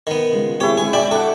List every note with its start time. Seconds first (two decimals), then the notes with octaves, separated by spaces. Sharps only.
0.07 D#3 B3
0.32 C#3 G#3 F4
0.60 C4 E4 G4 G#4 C#5
0.77 D3 G#3 C4 G#4
0.93 E4 F#4 D5 G5 B5 D6
1.11 D4 A4 F#5